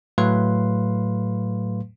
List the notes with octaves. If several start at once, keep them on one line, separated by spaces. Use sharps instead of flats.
A2 F#3 A3 B4 F5 C6